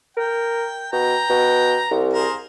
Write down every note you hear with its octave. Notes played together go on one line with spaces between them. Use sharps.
A#4 G5
B2 G5 A#5
B2
C2
G#4 A#4 C5